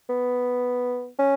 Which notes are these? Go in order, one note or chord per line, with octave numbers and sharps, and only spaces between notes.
B3
C#4